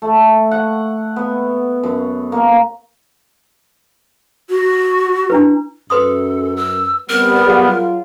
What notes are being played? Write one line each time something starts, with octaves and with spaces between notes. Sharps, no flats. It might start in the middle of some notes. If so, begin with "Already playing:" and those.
A3
F#5
B3
F#2
A#3
F#4
D4 E4 B4
F#2 A4 B4 C6 D#6
E6
G3 B3 C4 A#4
F#3 F4 G#4 C#5 F#5